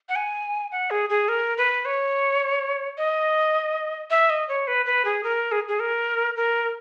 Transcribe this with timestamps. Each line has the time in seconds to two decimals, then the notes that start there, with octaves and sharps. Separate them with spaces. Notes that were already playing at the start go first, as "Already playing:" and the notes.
0.09 F#5
0.16 G#5
0.72 F#5
0.91 G#4
1.10 G#4
1.28 A#4
1.57 B4
1.85 C#5
2.98 D#5
4.10 E5
4.30 D#5
4.48 C#5
4.67 B4
4.86 B4
5.05 G#4
5.24 A#4
5.52 G#4
5.68 G#4
5.80 A#4
6.36 A#4